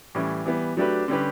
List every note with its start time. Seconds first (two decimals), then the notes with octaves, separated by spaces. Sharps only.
0.15 A2 E3 G3 C#4
0.46 E3 G3 B3
0.77 F#3 A3 D4 G4 B4
1.08 D3 G3 C#4 G4 B4